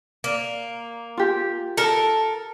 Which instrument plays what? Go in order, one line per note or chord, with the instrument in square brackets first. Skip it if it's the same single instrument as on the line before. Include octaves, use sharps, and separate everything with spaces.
[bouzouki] A#3
[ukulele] F4 G4
[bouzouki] A4 A#4